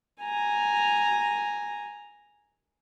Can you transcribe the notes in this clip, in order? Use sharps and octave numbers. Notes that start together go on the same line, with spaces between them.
G#5 A#5